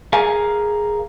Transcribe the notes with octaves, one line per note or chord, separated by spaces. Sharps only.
G#4 A#4 F5 G#5